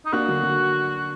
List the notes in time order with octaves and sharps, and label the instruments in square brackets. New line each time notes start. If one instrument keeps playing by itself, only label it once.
[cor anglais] D#4
[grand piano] A#3 D4 [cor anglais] F#4
[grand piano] D3 F#3
D3